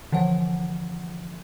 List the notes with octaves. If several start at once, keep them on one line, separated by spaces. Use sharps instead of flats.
D3 E3 F3 F#5